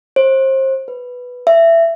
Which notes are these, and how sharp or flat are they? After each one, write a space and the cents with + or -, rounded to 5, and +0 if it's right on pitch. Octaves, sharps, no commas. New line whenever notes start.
C5 +30
B4 +0
E5 +15